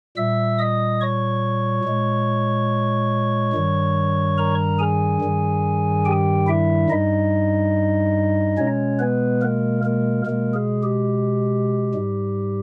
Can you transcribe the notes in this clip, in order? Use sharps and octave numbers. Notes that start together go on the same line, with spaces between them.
A#2 G3 E5 E6
D#5 D#6
C#5 C#6
A#2 G#3
G2 D#3 G3
A#4 A#5
G#4 G#5
G2 D#3 G3
G4 G5
E4 E5
G2 G3 D#4 D#5
B2 G#3 C#4 C#5
B3 B4
A#3 A#4
A#3 A#4
B2 G#3 A#3 A#4
G#4
G4
G#2 G3